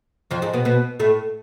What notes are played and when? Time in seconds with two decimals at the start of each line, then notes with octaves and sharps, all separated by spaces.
0.31 F2 F3
0.42 G#2 G#3
0.53 B2 B3
0.65 B2 B3
0.99 A2 A3